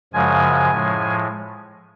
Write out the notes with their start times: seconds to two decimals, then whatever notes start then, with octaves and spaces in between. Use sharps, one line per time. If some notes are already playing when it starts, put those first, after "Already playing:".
0.13 F#2 C#3 F3 G#3 G#5
0.70 A2 F3 G#3